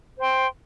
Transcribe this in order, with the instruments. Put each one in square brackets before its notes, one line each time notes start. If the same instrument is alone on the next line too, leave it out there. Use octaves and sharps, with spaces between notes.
[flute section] C5 G5 C6